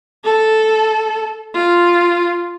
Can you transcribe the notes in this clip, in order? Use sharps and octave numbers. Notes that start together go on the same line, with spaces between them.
A4
F4